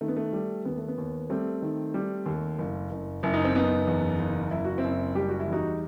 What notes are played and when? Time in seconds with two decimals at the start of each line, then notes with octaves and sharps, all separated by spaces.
0.01 D#3 A3
0.08 B3
0.16 A3
0.33 G3
0.65 D#2 B3
0.77 A3
0.88 B3
0.98 D#2
1.30 G3 A3 C4
1.62 D#3
1.94 G3
2.26 D#2
2.58 F#1
2.91 F#1
3.23 F#1 E4
3.34 D#4
3.44 C4
3.54 F#1 B3 D#4
3.87 E2
4.19 F#1
4.51 F#1 E4
4.65 F#4
4.78 C4 E4
4.84 F#1
5.15 G3 G4
5.28 F#4
5.40 E4
5.48 E2 D#4 F#4